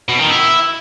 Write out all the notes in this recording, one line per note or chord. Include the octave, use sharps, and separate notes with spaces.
B2
D#3
E4